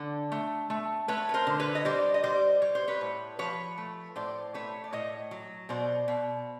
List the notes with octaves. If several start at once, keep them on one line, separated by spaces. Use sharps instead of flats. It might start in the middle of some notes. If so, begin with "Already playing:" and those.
Already playing: D3
A3
A3
A3 B4 C#5
B4
A#4 C5
D3
B4 C#5
D#5
G3 C5 D5
D#5
G3 C5 D5
G3 C#5
C5
B4 C#5
A2
F3 B4 C#5
A3
A2 C5 D5
A3 B4 C#5
D5
A2 C#5 D#5
F#3
B2 C5 D5
B2